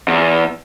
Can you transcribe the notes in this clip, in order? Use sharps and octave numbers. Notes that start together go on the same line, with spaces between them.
E2